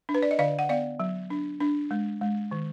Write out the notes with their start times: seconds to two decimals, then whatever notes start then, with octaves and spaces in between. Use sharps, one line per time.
0.09 D4
0.15 B4
0.23 D5
0.31 D#5
0.39 D3 D5 F5
0.59 F#5
0.69 B3 D5 F5
1.00 F#3
1.30 D4
1.60 D4
1.91 G#3
2.21 G#3
2.51 D#3